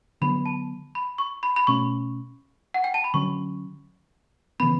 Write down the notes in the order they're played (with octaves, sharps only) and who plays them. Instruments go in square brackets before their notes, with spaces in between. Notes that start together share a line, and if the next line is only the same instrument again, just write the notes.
[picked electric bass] D3 F#3 B3 [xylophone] B5
[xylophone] A5
B5
C#6
B5
B5
[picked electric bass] B2 A3 C#4 [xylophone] C#6
[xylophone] F#5
G5
A5
B5
[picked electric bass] D3 F#3 C#4 [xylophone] C#6
[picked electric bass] C#3 E3 B3 [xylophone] B5